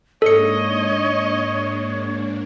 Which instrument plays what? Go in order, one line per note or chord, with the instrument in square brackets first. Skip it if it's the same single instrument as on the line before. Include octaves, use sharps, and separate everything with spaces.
[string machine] G#2 A#3 D4 [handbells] A4 C#7 [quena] C#5 [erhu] D#5